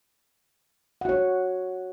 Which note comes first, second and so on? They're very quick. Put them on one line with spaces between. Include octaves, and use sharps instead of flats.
F#5 F#4 C#5